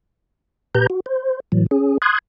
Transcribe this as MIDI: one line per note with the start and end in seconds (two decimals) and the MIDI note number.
0.75 0.87 46
0.75 0.87 67
0.75 0.87 71
0.75 0.87 82
0.75 0.87 91
0.90 1.00 66
1.06 1.40 72
1.52 1.66 45
1.52 1.66 52
1.52 1.66 54
1.71 1.98 61
1.71 1.98 68
2.02 2.19 84
2.02 2.19 87
2.02 2.19 90
2.02 2.19 92